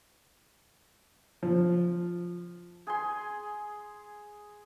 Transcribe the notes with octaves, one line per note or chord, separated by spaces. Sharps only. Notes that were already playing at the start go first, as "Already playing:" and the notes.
F3
G#4 G#5 C6